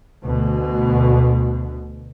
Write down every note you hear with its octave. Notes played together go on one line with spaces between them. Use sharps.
D2 B2